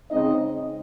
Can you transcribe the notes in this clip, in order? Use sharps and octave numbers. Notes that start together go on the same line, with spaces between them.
C#3 G#3 C4 D#4 D#5